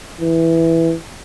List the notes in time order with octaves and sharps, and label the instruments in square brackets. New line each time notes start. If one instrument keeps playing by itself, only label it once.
[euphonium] E3